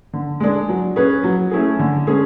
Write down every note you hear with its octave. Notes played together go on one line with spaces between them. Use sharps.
D3
G#3 D4 G#4
F#3
C#4 G#4 B4
F#3
A3 C#4 E4 G#4
D3
G#3 C#4 G#4